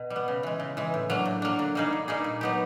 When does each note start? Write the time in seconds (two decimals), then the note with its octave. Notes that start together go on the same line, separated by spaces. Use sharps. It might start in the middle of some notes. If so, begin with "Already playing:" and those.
Already playing: B2
0.10 G3
0.16 B3
0.28 C#3
0.43 E3 G#3
0.60 C#3
0.77 E3 G#3
0.94 A2
1.10 F#3 A#3 D4
1.25 A2
1.42 F#3 A#3 D4
1.59 D3
1.75 G3 A#3 D#4 G#4
1.93 D3
2.08 G3 A#3 D#4 G#4
2.24 A#2
2.41 F#3 B3 D#4 G4